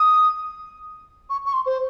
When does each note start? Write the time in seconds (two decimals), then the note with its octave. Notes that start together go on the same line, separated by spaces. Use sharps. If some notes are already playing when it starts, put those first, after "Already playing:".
Already playing: D#6
1.30 C#6
1.46 C#6
1.54 C6
1.66 C5